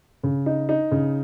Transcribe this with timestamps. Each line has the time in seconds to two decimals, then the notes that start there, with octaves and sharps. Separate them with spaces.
0.24 C#3
0.46 D#4
0.69 D#4
0.91 C#3